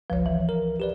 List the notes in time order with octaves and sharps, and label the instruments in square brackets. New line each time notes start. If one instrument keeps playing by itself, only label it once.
[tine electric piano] G1 C#2 B4 [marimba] F3 C#5
[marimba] E3
[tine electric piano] A#4
G4 B4 D5